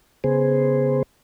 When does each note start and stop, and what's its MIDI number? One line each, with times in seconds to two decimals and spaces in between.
0.24 1.03 49
0.24 1.03 59
0.24 1.03 68
0.24 1.03 72